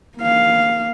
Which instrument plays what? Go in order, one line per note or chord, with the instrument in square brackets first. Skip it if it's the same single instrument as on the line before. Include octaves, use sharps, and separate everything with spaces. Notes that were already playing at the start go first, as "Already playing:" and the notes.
[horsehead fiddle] A#3 F5